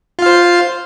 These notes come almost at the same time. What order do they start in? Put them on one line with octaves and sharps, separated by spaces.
F4 F5 C5